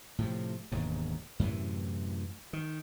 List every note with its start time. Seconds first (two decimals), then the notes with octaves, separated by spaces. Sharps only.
0.18 A2 C3 F3
0.72 E1 D#2 G#2
1.39 F#2 A2 C3 E3
2.53 D#3